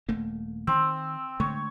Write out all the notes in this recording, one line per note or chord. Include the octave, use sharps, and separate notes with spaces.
D#1 A3 A#3
D#3 C4
D3 G#3 A3 C#5